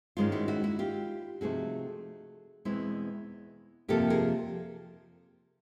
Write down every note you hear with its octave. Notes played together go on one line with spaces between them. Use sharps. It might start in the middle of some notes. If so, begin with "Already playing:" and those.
G#2 D#3 G#3 C#4 F4
E4 F#4
E4 F#4
E4 F#4
F4 G4
C3 F3 A3 C4 D#4 F#4 G#4
E2 B2 G#3 C4 E4
F2 C3 F3 A#3 G4 A4
G#4 A#4